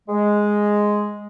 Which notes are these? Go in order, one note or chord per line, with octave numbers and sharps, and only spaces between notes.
G#3